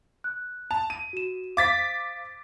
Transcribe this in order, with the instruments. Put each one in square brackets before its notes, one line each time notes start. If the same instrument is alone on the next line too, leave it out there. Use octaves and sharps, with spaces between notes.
[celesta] F#6
[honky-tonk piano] A5 [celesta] F7
[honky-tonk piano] D#7
[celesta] F#4 E7
[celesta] C5 F5 [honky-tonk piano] D6 A6 B6